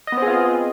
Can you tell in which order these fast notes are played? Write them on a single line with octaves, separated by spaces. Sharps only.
D#5 B3 C4 G#4 F4